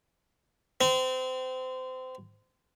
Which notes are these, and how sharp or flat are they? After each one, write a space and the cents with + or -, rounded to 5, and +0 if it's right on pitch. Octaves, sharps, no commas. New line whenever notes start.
C4 -25